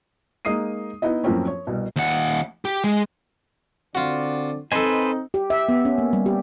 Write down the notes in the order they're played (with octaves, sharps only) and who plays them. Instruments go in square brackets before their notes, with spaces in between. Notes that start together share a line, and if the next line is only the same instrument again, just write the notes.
[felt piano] G#3 A#3 D#4 D#6 C7 D#7
B3 D#4 E4 D#5
F#2 A2 F3 A#3 C4 C#4
C#5
C2 B2
[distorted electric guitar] D#2 F#5
G4
G#3
[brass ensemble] D3 C4 D5 [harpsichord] F4 F#4
[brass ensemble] C4 D#4 [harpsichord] A4 D#5 [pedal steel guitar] B4 C5 G#5
[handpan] G4
E5
B3
C#4
A#3
G3
G4